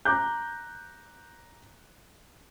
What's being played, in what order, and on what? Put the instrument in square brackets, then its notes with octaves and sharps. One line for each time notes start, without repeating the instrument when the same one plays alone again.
[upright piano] A#5 D6 F#6 G6